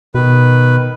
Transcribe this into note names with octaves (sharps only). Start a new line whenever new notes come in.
B2 D#3 B4